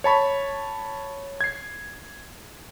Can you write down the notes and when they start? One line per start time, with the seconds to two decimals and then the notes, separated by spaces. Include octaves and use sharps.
0.04 C#5 A5 B5 C#6
1.41 G#6 C7